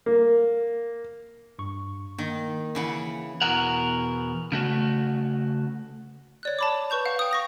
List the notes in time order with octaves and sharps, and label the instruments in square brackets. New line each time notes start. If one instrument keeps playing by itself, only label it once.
[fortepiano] A#3
[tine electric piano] G2 C#6
[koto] D#3 [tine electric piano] A#3
[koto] C#3 E3 F#5
[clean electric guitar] E2 B2 A#4 F#5
C#3 A3 F#4
[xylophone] C#5 D5 F#6
A5 B5 D6
B4 C#6 G6 F7
F5 F#5
G5 D#6
C#6 A#6 F7